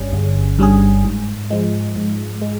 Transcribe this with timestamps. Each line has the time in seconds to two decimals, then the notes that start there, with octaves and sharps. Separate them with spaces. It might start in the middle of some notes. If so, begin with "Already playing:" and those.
Already playing: G1 G2 G3 C#4 G#4
0.13 G1
0.59 G2 G3 C#4 G#4
1.04 G#2
1.50 F3 G#3
1.96 G#2
2.42 G#3